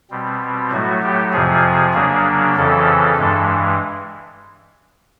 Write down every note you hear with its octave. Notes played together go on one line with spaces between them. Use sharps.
B2 G3 C4
A2 F#3 A3 F#4
G4
F2 C3 F3 G#4
C#3 F#3 A#3 D4
F2 C#3 E3 A4
G2 E3 G#3